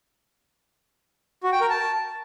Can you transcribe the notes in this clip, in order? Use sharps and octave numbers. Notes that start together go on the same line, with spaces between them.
F#4
G5
A#4
A5